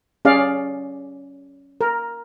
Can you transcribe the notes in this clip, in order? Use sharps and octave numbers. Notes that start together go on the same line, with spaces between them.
C#4 G#4 D5 F5
A#4